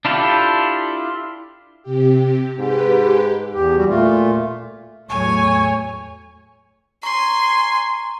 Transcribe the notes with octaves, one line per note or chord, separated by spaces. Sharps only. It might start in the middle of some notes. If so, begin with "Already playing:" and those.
D4 E4 F4 G4 A4
C3 G4
G#2 G4 B4
E2 G4
E2 G3 F#4
A#2 A3 F4
E2 A2 F#3 A3 C#5 G#5 C#6
G#5 A#5 C6 C#6